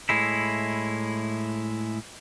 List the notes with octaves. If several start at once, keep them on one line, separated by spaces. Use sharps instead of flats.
A2 G#3 E4